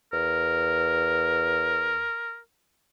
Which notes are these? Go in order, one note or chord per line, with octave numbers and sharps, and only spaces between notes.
E2 A#4